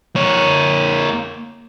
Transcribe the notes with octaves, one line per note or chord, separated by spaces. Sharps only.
A#3 C#5